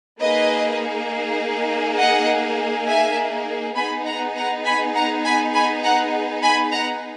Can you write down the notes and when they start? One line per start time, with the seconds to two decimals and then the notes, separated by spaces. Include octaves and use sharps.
0.20 A#3 D#4 G#4 B4 D#5
1.98 D#5 F#5
2.87 E5 G#5
3.76 B3 D#4 G#4 G#5 B5
4.06 F#5 A#5
4.35 F#5 A#5
4.65 G#5 B5
4.94 F#5 A#5
5.24 G#5 B5
5.54 G#5 B5
5.83 F#5 A#5
6.42 G#5 B5
6.72 F#5 A#5